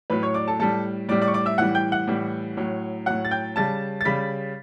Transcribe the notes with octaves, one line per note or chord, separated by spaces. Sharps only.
A2 F#3 B4 B5
C#5 C#6
D5 D6
A4 A5
A2 G3 A4 A5
A2 G3 D5 D6
D5 D6
C#6
D5 D6
E5 E6
A2 E3 G3 F#5 F#6
G5 G6
F#5 F#6
A2 E3 G3
A2 F#3
A2 F#3 F#5 F#6
A6
G5 G6
C#3 G3 A5 A6
A6
C#3 G3 B5 B6